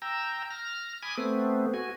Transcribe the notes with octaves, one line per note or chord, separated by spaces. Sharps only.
G5 A#5 E6
F6 A#6
G#5 B5 D6 D#6 G#6
A3 B3 C4
F#4 G#5